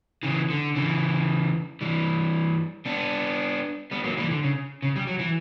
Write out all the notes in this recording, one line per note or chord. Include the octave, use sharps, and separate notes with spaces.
C#3 E3
D3
C#3 E3
E3 G3
B3 D4
G3 B3
F#3 A#3
E3 G3
D3
C#3
C#3
G3
F#3
E3